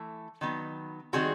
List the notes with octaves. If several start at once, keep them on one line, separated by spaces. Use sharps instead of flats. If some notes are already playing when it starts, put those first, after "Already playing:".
Already playing: E3 A3
D#3 F#3 B3
D#3 G3 C4 F#4 G#4